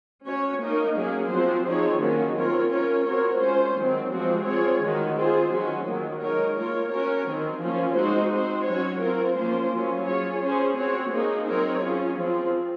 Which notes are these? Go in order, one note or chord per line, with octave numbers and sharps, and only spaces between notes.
C#4 F#4 C#5
A#3 D#4 A#4
F#3 A#3 C#4 G#4
F3 C4 F#4 C5
F3 C4 D#4 G#4 C#5
D#3 F#3 A#3 C#4 F#4
C4 F4 A#4 C#5
C#4 F4 A#4 C#5
C4 F#4 A#4 C#5
G#3 C#4 F4 C5
D#3 F#3 C4
F3 G#3 C4 F#4
C4 F4 G#4 C#5
D#3 G#3 D#4 F#4
C4 F4 G#4 C5
D#3 F#3 C#4 F#4
D#3 F#3 A#3
G#3 D#4 A#4 C#5
A#3 F4 A#4 C#5
C#4 F#4 A#4 C#5
D#3 F#3 C4
F3 A#3 C#4 F4
G#3 C4 D#4 F#4 C5
C4 F#4 C5
F#3 C#4 F#4 C#5
C4 F4 A#4
F3 A#3 C#4 F4 C5
F#3 C#4 F4
C#4 F4 G#4 C#5
C#4 G#4 C5
C4 F#4 C#5
A#3 D#4 G#4
F#3 C4 D#4 A#4 C#5
C#4 F4 G#4
F3 C4 F4